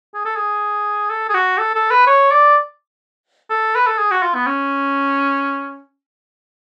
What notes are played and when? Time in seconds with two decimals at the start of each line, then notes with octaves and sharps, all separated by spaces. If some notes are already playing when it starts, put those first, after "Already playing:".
0.14 G#4
0.25 A4
0.36 G#4
1.10 A4
1.29 G#4
1.34 F#4
1.58 A4
1.74 A4
1.91 B4
2.07 C#5
2.31 D5
3.50 A4
3.76 B4
3.87 A4
3.98 G#4
4.11 F#4
4.22 F4
4.35 B3
4.47 C#4